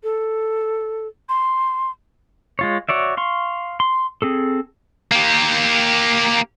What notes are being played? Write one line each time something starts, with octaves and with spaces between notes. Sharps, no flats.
A4
C6
G#3 F4 C#5
F#4 C#5 D5 E5
F5 C6 C#6
C6
C4 G#4 A4
A#3 G4